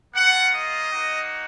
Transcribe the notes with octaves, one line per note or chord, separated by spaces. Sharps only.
A#3 F4 F#5
D#5
A#3 D#4 F#4